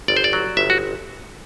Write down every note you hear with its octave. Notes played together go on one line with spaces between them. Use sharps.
G1 D5
C5
D5
F#3
G1 E5
F#4